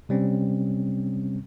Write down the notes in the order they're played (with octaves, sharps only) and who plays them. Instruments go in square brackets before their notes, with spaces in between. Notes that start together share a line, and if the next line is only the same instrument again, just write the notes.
[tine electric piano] C3 G3 C4 C#4